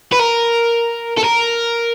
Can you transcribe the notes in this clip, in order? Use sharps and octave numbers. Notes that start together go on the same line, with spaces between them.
B4
A#4
A4
A#4